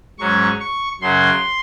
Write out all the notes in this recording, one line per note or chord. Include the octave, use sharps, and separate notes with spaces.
G#2 F#3 C#4 C#6
C#6
F#2 C#3 F#3 C6